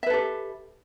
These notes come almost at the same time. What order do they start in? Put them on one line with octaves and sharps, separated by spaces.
E5 B4 A4 G4